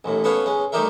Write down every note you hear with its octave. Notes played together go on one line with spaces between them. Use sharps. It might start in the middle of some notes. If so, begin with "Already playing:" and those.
A1 D#2 A2
B3 C#4 A4 B4 C#5 F5
G#3 C#4
G3 A3 D#4 G4 A#4 E5